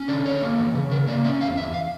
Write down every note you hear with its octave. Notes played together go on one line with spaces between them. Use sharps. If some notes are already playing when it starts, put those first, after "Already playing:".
Already playing: C#4
D3 D5
D3 C#5
A#3
E3
C#3
C#3 A#4
A#3 D5
C#4 E5
E2 F5
E2 E5
F5